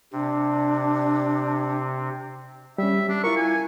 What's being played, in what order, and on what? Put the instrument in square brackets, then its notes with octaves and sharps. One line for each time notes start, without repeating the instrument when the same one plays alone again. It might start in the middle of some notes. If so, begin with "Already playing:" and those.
[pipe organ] C3 [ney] D4
[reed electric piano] G3 C#4 [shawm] E5
[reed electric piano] G3 [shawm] D4
[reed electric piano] E4 F4 A#4 [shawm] C#6
[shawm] G#5